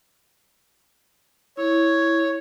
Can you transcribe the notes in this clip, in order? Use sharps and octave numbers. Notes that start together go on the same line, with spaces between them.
E4 C#5